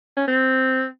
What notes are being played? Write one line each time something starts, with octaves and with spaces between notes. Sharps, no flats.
C#4
C4